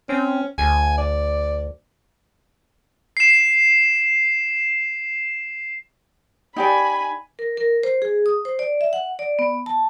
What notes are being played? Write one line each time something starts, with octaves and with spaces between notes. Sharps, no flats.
C4 C#4
D2 G#5
D5
C7 E7
D#4 G4 D5 G#5 B5
A#4
A#4
C5
G#4
D#6
C5
D5
E5
F#5
D5
B3
A5